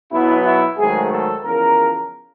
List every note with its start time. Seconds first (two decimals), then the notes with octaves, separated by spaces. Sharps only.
0.11 B1 B2 F#3 B3 E4
0.44 E4
0.78 G#2 D#3 F#3 A3 G#4
1.11 A4
1.44 E2 C#3 F3 A#4